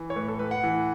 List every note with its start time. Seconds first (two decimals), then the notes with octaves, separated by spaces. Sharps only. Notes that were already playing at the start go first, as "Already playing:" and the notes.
Already playing: E3
0.10 C#5
0.16 A2 B4
0.28 A4
0.39 A2 B4
0.51 F#5
0.64 E3